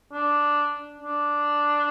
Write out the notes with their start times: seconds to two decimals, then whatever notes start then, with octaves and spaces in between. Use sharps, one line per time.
0.13 D4
1.01 D4